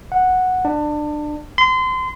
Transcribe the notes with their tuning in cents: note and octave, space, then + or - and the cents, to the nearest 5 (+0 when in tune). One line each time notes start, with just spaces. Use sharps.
F#5 -5
D4 +25
C6 -30